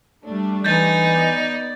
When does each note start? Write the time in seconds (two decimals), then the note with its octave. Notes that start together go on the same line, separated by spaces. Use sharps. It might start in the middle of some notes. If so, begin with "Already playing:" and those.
0.25 G3 A3 D4
0.64 E3 D#4 G6 A6
1.04 B3 D5